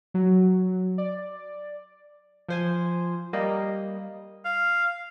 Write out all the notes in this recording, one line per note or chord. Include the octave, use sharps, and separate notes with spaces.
F#3
D5
F3 C5 G#5
G3 A#3 D#5
F5